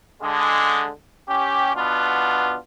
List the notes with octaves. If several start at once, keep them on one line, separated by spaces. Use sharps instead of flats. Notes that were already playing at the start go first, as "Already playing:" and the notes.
D3 G#3
C#4 G4
B2 B3 D4 F4